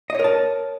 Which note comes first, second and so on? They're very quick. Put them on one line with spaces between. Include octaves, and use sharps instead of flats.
D#5 C#5 A#4 A5